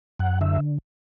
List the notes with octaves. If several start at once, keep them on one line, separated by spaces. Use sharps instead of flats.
F#2 F#5
D3 E5